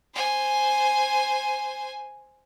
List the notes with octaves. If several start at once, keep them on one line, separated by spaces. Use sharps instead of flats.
C5 G#5